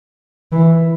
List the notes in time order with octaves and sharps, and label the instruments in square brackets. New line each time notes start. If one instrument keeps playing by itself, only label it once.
[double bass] E3